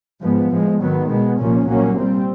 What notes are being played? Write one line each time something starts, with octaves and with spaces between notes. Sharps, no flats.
G#2 F3 G#3 B3
A2 F3 G#3
G#2 D#3 F#3 B3
B2 G#3 B3
C2 A#2 F3 A#3 C#4
C2 A#2 F#3 A#3 C#4
A#2 G3 C4